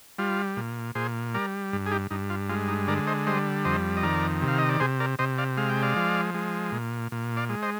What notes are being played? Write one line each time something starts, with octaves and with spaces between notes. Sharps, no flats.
G3 F4
A#2
A#2 G#4 C5
G3 A#4 D5
G2
G#4
D#4 G4
G2 D#4
F4
G#3 F4
D#4
D3 A#4 D5
C5 D#5
G3 C5 D#5
F2 C5 D#5
D#5
D#3 A#4 D5
C3
F5
D#5
D5
C3 G#4 C5
A#4 D5
C3 C5 D#5
D5 F5
G#3 F5
G5
D5 F5
F3
G#3
A#2
A#2
D5 F5
G#3
C5 D#5